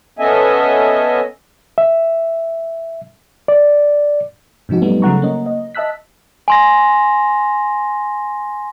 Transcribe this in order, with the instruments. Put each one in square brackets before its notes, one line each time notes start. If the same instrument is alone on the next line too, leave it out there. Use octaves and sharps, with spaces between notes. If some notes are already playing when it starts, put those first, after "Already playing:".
[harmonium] B3 C#4 A4 D#5 E5 G#5
[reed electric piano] E5
D5
[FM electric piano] G#2 C3 F3 D#4 F#4
F#3 G3 A3 B3 D#4
C#3 F#3 A3 F#5 A#5 C#6
A#3 C#4 D#5
D#5
D#5 E5 A5 E6 F#6 B6
[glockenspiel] G#5 C6 A#6